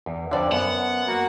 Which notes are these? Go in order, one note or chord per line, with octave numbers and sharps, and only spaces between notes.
E2
F2 D3 C5 D5 F5
F#2 B3 F#5
A#3 F#4